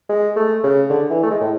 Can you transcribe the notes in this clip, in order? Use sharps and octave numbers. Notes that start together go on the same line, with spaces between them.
G#3
A3
C#3
D3
E3
A3
G#3
A2